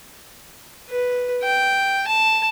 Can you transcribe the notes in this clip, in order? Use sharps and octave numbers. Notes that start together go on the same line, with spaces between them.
B4
G5
A5